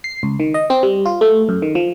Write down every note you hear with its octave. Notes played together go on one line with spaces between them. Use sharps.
C7
C#2
D#3
D#5
C4
G3
F4
A3
F#2
D#3
F3